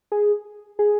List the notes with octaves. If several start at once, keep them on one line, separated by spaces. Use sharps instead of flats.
G#4
G#4